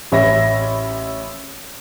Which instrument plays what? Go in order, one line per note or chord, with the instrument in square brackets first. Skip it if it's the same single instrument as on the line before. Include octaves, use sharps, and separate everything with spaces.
[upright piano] A1 C#5 E5 B5 A#6